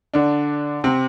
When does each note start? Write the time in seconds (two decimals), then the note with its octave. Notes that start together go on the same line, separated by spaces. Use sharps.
0.14 D3 D4
0.84 C3 C4